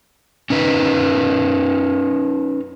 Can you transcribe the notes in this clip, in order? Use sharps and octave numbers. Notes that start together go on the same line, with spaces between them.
C#4 D#4 B4